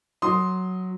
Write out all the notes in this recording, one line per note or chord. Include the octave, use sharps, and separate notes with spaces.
F#3 C6 D#6